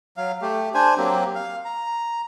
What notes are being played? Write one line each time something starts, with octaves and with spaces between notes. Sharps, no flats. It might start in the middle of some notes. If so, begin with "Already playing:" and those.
F#3 F5
A3 G4
D4 C5 G#5
F#3 A#3 C4 G4
F5
A#5